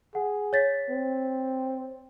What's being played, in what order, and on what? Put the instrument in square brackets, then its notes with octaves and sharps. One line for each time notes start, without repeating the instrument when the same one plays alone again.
[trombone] G#4 [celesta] F#5
[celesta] C#5 A6 B6
[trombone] C4